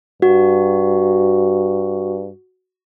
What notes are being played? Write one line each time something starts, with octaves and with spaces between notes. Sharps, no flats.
G2 F#4